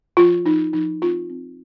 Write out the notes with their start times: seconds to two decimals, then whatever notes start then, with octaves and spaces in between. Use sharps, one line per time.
0.17 F3 F4
0.45 F3 D#4
0.73 F3 D#4
1.02 C4 F4
1.30 C4